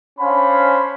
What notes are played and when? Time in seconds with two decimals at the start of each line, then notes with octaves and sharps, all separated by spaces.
0.20 C#4 D4 C5 F5 B5